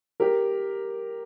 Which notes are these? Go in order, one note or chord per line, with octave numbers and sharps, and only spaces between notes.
G4 A#4